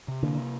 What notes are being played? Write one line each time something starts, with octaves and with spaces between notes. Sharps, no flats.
C3
D3 A#3
C3